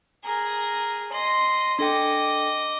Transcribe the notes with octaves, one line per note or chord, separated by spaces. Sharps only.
G#4 A#4
D#5 C6
D4 A4 D#5 G5 D6